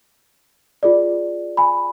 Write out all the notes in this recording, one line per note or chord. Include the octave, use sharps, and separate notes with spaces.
F4 G#4 D5
G#5 B5